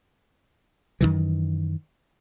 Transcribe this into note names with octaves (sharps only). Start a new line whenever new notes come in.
F#2 C3 D#3 E3